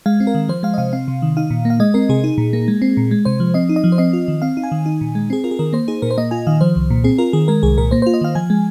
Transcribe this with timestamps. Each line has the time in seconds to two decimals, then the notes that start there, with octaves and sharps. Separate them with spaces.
0.06 G#3 F5
0.20 C4
0.27 A#4
0.35 D#3
0.49 F3 C5
0.63 G#3 F5
0.74 D#5
0.78 C3 F5
0.93 C4 F5
1.08 C3
1.22 D#3
1.37 D#4 F5
1.50 A#2
1.65 A#3
1.70 F5
1.80 G#3 D#5
1.94 C4 A#4
2.09 C3 G#4
2.24 D#4
2.38 A#2
2.53 A#3
2.68 G#3
2.82 C4
2.97 A#2
3.11 G#3
3.25 C3 C5
3.40 F3
3.54 C4 D#5
3.69 D#4
3.76 D#5
3.84 F3
3.92 C5
3.98 C4 D#5
4.13 F4
4.28 D#3
4.42 C4 F5
4.57 D#4
4.63 G#5
4.72 D#3
4.86 D#4
5.01 A#2
5.15 G#3
5.30 C4 G#4
5.44 F4 A#4
5.51 G#4
5.59 D#3 A#4
5.73 A#3 C5
5.88 D#4 G#4
6.02 A#2 A#4
6.11 C5
6.18 A#3 D#5
6.31 F4 G#5
6.47 D#3 F5
6.61 F3 C5
6.76 C2
6.90 A#2
7.04 C4 G#4
7.18 F4 A#4
7.33 D#3 G#4
7.48 G#3 A#4
7.63 C2 G#4
7.78 A#2 A#4
7.91 A#3 C5
8.02 F4 C5
8.14 D#5
8.21 D#3 F5
8.35 F3 G#5
8.50 G#3